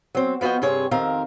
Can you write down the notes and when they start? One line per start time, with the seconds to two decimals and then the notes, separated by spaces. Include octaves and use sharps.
0.15 F#3 C4
0.41 F3 B3 F#4 D#5 G5
0.62 G2 C3 C4 G#4 C#5
0.91 F2 D#3 C4 A#4 F5